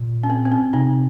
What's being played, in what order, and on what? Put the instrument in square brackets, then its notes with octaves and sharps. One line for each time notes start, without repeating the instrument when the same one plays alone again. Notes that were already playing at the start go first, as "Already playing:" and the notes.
Already playing: [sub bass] A#2
[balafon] C#4
C4
C4
C#4
[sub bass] C3 [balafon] C4 D#4